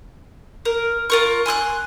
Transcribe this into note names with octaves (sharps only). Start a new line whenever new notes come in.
A#4
F4 A#4 C#6
G#5 C6 E6 F#6